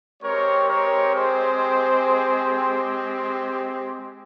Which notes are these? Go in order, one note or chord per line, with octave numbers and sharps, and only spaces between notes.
G#3 C4 G4 A#4 C#5
A#4 C#5
G#4 C5